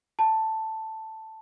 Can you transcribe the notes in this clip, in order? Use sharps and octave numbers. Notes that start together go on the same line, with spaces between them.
A5